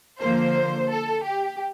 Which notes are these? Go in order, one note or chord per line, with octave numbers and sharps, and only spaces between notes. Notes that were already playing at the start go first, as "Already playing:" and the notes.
D3 F3 A#3 C5
A4
G4